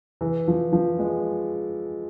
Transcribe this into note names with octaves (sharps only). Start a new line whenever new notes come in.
E3
F3
F3
G#3